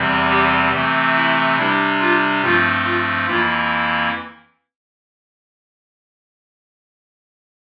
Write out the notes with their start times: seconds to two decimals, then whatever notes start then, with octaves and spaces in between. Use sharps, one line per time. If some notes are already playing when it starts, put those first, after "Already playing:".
Already playing: E2 C3 E3 G3 C4
0.31 G4
0.73 C3 E3 A3 C4
1.16 E4
1.57 C3 G3 D4 E4
2.00 F4
2.42 G2 F3 A3 C4 F4
2.84 F4
3.26 F2 E3 A#3 E4 F4